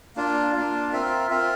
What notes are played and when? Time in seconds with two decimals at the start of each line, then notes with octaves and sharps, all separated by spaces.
0.16 A#3 D4 F4
0.54 A#3 D4 F4
0.92 C4 F4 A#4 E5
1.30 C4 F4 A#4 E5